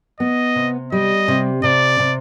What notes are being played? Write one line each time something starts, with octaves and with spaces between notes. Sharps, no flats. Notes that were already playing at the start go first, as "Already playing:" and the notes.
B3 D#5
C3
G3 D#5
C3
C3 D5
C3